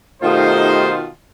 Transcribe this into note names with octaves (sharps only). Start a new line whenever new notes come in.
B2 D#3 A3 D#4 F4 G4 C5